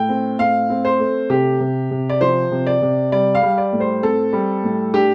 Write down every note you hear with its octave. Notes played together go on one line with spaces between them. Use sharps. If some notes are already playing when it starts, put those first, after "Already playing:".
Already playing: A2 G5
C4
A2 F5
C4
C5
A3
C3 G4
C3
C3
D5
F3 C5
C3
D5
C3
G3 D5
F5
G3
D5
A2
C5
C4 A4
G3
A2
D4 G4